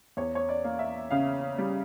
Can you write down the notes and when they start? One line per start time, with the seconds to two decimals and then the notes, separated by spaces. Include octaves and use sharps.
0.17 E2 C#5
0.35 C#5
0.49 D5
0.64 A#3
0.79 E5
1.11 C#3 F5
1.58 G3